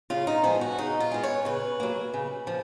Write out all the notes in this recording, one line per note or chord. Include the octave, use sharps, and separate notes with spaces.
C#3 F4
D#4
F3 G#3 B3 F4
F#4
C#3 D#4
F4
G#3 B3
C#5
C#3 B4
F#3 A#3
C#3
F3